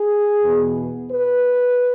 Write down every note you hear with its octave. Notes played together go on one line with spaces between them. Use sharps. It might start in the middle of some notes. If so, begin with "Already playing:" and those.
Already playing: G#4
E2 B2 B3
B4